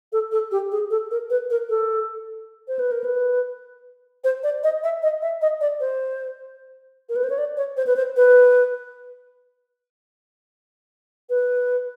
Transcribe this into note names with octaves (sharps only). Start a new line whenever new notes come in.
A4
A4
G4
G#4
A4
A#4
B4
A#4
A4
C5
B4
A#4
B4
C5
D5
D#5
E5
D#5
E5
D#5
D5
C5
A#4
B4
C5
C#5
D5
C#5
C5
B4
C5
B4
B4